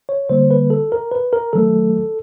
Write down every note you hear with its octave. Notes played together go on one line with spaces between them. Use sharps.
C#5
D3 G3 A#3 C5
B4
A4
A#4
B4
A#4
D#3 F#3 A3 A4